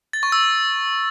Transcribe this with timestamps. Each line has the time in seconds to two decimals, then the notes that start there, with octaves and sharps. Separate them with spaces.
0.13 A6
0.23 C#6
0.32 E6